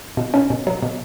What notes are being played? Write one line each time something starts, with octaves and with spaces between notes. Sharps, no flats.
B2
C#4
B2
F#3
B2